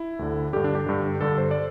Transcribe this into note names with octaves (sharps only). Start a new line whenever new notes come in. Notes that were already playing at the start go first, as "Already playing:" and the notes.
Already playing: E4
D2 D3
G2 D3 G4
D4
G4
G2 D3
G2 D3 A4
C5
D5